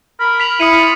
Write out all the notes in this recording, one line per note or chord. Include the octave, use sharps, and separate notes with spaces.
A#4 B5
B6 F7 F#7
E4 F5 D#6 C#7 D#7
F4